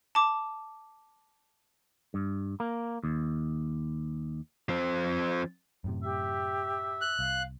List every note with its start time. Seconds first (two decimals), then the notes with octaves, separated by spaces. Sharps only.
0.15 A5 D6
2.14 G2
2.60 A#3
3.04 D#2
4.69 F3 C4
5.84 F#2 A2 C3
6.03 G4 E5
7.01 F#6
7.19 C2 F5